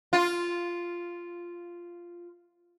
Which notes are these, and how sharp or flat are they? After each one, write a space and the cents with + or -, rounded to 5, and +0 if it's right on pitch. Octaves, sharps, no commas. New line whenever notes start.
F4 -5